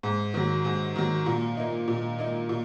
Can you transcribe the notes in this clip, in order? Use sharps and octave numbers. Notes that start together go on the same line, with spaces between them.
G#2
D#3 F#3
G#2
D#3 F#3
A#2
A#3 D#4
A#2
A#3 D#4
A#2